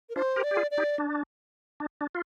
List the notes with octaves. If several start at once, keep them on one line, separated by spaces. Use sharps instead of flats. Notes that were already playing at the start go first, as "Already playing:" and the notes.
A#4
D4 F4 C5
G4 A#4
D5
G4
F4 G#4
D5
D#4 G4
D4
D4
D4
F4